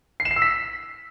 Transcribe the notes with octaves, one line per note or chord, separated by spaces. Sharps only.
C7
E7
C7
E6
B6